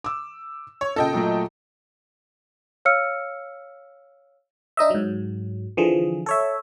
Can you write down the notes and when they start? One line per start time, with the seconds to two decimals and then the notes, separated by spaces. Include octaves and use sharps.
0.04 D6 E6
0.81 C#5
0.96 A#2 C#3 A4 D#5 G5
1.13 A#2 F#3 A3
2.85 C#5 F5 E6 F6 C#7
4.77 D4 D#4 D#5 E5
4.90 G#2 F#3
5.77 D3 E3 F3 G#4
6.26 A4 C#5 E5